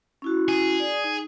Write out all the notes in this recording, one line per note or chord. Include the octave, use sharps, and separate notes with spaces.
C#4 E4 F#4
G#4
D5
D#4